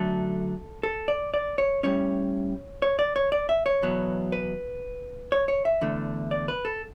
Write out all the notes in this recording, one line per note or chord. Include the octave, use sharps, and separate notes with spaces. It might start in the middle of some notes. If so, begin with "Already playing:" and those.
Already playing: F#2 D3 F#3 A3 A4
A4
D5
D5
C#5
A2 G3 C#4 C#5
C#5
D5
C#5
D5
E5
C#5
E2 B2 F#3 B3
B4
C#5
C#5
E5
E2 D3 A3
D5
B4
A4